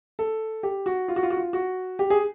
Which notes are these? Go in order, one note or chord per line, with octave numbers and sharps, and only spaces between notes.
A4
G4
F#4
F4
F#4
F4
F#4
F4
F#4
G4
G#4